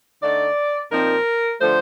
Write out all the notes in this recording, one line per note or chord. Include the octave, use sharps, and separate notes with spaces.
D3 A3 D#4 D5
A#2 F3 C4 D#4 A#4
D3 F3 A3 C5